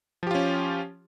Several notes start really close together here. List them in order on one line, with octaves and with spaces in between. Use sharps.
F3 G4 F4 C#4